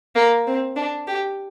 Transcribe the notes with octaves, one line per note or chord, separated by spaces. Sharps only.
A#3
C4
D4
G4